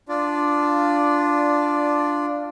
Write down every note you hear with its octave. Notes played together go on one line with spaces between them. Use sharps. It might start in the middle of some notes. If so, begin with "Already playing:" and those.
D4 F4 D5